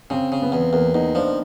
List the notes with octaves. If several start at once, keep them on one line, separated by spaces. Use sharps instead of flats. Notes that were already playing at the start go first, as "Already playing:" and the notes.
C#3 C4
C#3
B3
E2
E2 A#3
E2 D#4
F3 D4